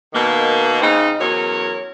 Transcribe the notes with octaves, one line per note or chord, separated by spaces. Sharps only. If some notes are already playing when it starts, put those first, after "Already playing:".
B2 D#3 A#3
C#3 C4 D#4
E2 F#3 C#4 A#4 C#5